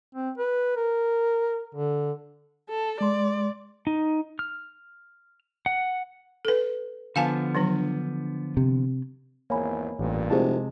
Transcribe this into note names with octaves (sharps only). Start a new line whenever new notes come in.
C4
B4
A#4
D3
A4
G#3 D5 C6
D#4
F6
F#5
A4 B4
D3 F3 B3 F5 G#5 A5
D#3 F#3 D4
C3
G#1 E2 A#3 C#5 G#5 B5
A1 G2 A#2
F1 C3 G#3 E4 G#4 C5 A5